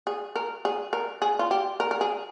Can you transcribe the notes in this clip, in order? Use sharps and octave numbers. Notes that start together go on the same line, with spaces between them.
G#4
A#4
G#4
A#4
G#4
F4
G4
A#4
A#4
G#4